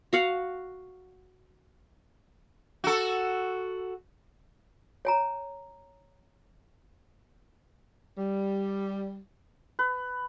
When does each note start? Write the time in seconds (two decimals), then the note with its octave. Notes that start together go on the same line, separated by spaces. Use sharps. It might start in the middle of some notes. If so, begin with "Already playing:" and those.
0.13 F#4 F5 F#5
2.84 F#4 A4
5.05 C#5 G#5 A#5
8.18 G3
9.79 B4